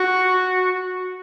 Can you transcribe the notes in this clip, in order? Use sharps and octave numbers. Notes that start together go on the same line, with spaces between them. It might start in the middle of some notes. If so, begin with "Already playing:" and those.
Already playing: F#4